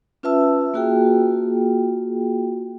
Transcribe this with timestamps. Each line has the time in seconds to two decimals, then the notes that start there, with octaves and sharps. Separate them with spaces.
0.23 C#4 F4 B4 E5 A5 E6
0.74 A#3 F4 F#4 G#4 G5